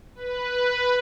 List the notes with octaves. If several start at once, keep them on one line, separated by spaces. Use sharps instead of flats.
B4